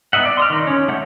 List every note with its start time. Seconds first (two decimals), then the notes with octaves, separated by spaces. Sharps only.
0.13 B3 D#4 D#5 E5 F#5
0.25 D5
0.37 C6 D#6 F6
0.50 D#3 D#4
0.67 C#4
0.88 A3 F#5 G6